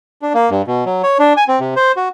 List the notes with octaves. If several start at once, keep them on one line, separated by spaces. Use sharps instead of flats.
D4
A#3
G2
B2
F#3
C#5
D4
G#5
C4
C3
C5
F#4